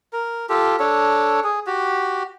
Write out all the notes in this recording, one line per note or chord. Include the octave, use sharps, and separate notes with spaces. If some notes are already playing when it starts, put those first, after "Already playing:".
A#4
F4 G4 A4
D4 A4 C#5
G#4
F#4 G4